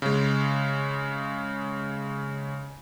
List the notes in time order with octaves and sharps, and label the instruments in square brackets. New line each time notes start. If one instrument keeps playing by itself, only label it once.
[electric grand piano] C#3 G#3